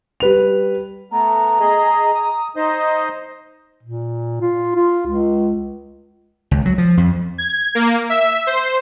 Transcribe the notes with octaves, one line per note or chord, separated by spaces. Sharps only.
G3 B4 F7
A3 B3 A#5
G#4 D#5
D#6
D#4 C5 D#5
A#2
F4
F4
C#2
C#2
F#3
F3
F2
G#6
A#3
E5
C5